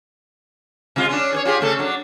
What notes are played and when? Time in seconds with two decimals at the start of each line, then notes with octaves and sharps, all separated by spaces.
0.96 C3 G#3 F4
1.09 C#4 D4
1.33 G#4 C5 C#5
1.45 F4 G4 G#4
1.61 C#3 A3 A4
1.79 F#3 D4